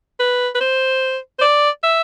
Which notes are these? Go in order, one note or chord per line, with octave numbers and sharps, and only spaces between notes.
B4
B4
C5
C5
D5
E5